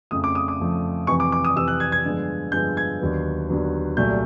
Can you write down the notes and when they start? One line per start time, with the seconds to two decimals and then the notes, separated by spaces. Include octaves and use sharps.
0.11 F2 C#3 F3 A3 D#6
0.24 D6
0.35 D#6
0.48 D6
0.60 F2 C#3 F3 A3
1.07 F2 C3 E3 C#6
1.20 D6
1.32 D6
1.45 D#6
1.56 F2 C3 E3 E6
1.68 F#6
1.80 G#6
1.92 G#6
2.05 G2 D3 F3 G#3 B3
2.52 G2 D3 F3 G#3 B3 G6
2.77 G#6
3.01 D#2 D3 F#3 B3
3.48 D#2 D3 F#3 B3
3.97 C2 A#2 F#3 A3 G6